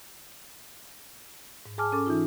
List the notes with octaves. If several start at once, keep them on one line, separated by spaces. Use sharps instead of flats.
G#2
G#4 G#5 A5 D6 F6
C#4 A4 D6
E3 D#4 F4